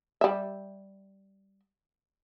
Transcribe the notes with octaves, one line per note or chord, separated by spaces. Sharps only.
G3 E5